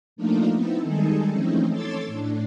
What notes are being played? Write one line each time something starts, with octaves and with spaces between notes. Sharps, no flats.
F3 A3 A#3 D4 D#4 F4
B3 C4 D#4 E4 A4
D#3 G3 G#3 D#4 G#4 A4
E3 F3 A3 C4 C#4 D#4
A4 C#5 C6 D6 E6 A6
A2 D4